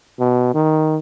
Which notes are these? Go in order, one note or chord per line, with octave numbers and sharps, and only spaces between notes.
B2
D#3